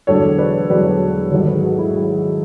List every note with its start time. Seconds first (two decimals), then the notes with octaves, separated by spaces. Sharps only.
0.07 E1 E2 D3 F#3 A4 C#5
0.38 B4 D5
0.69 E1 E2 D3 F#3 B4 D5
1.32 G#1 G#2 F#3 A4 C#5
1.47 G#4 B4
1.63 F#4 A4
1.78 E4 G#4
1.97 F#3